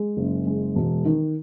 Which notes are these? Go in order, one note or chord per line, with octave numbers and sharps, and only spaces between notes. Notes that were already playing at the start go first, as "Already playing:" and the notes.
Already playing: G#3
F#1
G#3
E1
D#3